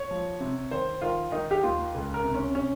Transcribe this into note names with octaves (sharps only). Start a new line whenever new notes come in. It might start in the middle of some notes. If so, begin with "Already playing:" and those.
Already playing: C#5
F3
C3
D#3 C5
D#3 F4
D#3 D#4
G4
D#2 F4
C#2
A#4
C3
C#4
C3 C#4